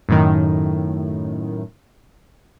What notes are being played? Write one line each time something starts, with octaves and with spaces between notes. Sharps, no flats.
F#2 A2 D#3